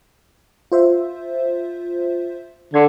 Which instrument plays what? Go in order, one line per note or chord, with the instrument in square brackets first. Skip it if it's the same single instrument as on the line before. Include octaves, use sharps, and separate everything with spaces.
[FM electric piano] F4 C5 E5
[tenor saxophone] D3 [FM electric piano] C6 G#6